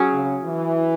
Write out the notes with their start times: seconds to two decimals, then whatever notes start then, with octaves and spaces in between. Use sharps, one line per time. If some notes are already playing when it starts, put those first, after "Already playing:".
Already playing: F#3 C#4 G#4
0.13 C#3
0.45 E3